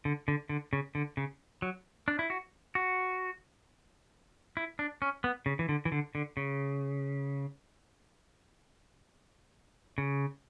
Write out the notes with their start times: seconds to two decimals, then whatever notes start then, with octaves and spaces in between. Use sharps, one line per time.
0.05 D3
0.28 D3
0.49 D3
0.73 C#3
0.95 D3
1.17 C#3
1.62 F#3
2.08 D4
2.19 E4
2.30 F#4
2.75 F#4
4.57 E4
4.79 D4
5.02 C#4
5.24 B3
5.46 C#3
5.59 E3
5.69 D3
5.85 E3
5.92 D3
6.15 D3
6.37 C#3
9.98 C#3